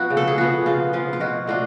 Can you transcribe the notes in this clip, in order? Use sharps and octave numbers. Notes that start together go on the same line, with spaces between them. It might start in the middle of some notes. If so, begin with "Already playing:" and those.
Already playing: F3 B3 F#4
C#3
A4
G#4
F3 B3 F#4
C#3 F4
F3 B3 F4
F4
B2 F#4
A3 D4 F4 F#4